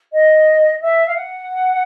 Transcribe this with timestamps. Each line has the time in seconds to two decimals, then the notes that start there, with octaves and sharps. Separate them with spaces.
0.13 D#5
0.82 E5
1.08 F5
1.15 F#5